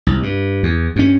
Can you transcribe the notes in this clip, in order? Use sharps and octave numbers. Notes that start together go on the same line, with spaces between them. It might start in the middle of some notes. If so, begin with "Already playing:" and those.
C2
G2
E2
G2 C#4